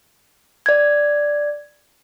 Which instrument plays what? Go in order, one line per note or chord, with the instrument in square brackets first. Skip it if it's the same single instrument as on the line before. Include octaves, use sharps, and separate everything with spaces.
[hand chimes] D5 G#6